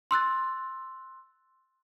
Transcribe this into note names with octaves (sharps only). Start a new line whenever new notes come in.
C6 E6 F#6 A6